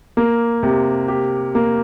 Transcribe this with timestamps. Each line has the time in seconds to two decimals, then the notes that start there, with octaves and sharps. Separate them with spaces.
0.17 A#3
0.63 C3
1.08 G4
1.55 A#3